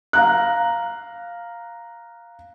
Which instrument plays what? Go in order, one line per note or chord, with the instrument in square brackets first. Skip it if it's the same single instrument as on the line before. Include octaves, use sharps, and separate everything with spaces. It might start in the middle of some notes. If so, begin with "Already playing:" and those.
[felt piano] F5 A#5 F#6